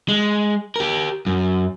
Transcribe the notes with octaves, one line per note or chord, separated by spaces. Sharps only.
G#3
G4 A#4
F#2